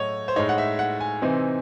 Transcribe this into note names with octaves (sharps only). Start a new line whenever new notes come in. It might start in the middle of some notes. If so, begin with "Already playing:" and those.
Already playing: A2 F#3 A3 C#5 D#5
C5
A2 G#3 D#4 C#5
F#5
E5
F#5
G#5
C3 E3 C4 D#4